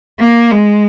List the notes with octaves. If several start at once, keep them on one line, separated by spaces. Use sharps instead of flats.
A#3
G#3